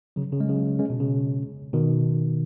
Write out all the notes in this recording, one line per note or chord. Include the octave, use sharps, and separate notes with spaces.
C#3 F#3
C#3
G#3
C#3 F#3
G#3 C#4
B2
C#3
B2 D#3